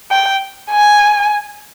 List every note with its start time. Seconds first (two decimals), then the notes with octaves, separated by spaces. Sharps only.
0.11 G5
0.71 G#5